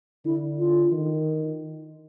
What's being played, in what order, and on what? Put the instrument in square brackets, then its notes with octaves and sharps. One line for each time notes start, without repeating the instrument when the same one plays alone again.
[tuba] D3 [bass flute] E4
[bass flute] F4
[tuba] D#3